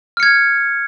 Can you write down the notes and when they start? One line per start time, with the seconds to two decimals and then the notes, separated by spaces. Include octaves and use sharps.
0.17 F6
0.20 C#7
0.23 G#6